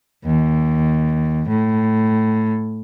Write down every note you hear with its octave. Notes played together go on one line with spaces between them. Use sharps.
D#2
A2